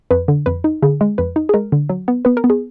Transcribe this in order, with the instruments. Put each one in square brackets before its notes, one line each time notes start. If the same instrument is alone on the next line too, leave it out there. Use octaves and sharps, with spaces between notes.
[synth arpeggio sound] F2 B4
D3
F2 B4
D#4
D3 G#4
G#3
F2 B4
D#4
G#4
G#3 A#4
D3
F#3
B3
B3 B4
A#4
B3
G#4